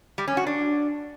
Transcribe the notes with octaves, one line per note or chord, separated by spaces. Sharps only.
G3
C#4
F#4
D4